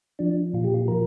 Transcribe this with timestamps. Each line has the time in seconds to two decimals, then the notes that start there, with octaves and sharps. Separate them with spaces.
0.19 F3 D4
0.54 A#2 F4
0.64 G4
0.74 F4
0.88 F3 A#4